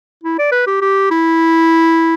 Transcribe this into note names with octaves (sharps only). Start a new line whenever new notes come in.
E4
D5
B4
G4
G4
E4